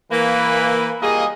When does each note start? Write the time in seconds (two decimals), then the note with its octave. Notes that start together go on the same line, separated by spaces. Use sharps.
0.11 E3 A#3 B4
1.01 G3 A#3 F4 G#4 D#5